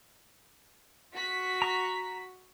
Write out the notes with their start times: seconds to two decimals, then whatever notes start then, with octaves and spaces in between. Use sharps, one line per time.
1.14 F#4 B6
1.62 A#5 C#6